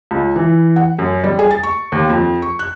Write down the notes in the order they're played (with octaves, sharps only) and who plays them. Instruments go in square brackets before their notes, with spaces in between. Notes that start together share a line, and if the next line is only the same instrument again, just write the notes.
[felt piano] C#2
E3
F#5
F#2
G3
G#4
A6
C#6
D#2
F2
C#6
F#6